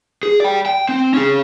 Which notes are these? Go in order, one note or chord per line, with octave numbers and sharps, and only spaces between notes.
G#4
D5 G5
G5
C4
C#4 G#4